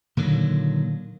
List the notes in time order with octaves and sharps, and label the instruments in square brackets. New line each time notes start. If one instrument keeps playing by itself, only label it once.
[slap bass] A#2 D3 D#3 F#3